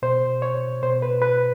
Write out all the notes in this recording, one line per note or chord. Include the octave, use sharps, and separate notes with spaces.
B2 C5
C#5
B2 C5
B4
B4